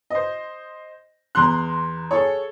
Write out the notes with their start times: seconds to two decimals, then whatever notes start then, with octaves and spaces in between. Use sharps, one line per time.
0.10 C5 D#5
1.35 E2 A#5 C6 F#6
2.11 G#4 A4 C#5